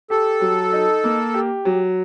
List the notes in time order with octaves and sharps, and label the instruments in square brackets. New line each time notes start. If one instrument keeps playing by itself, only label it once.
[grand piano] G4 [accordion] A4
[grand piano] F#3
D#4
A#3
G4
F#3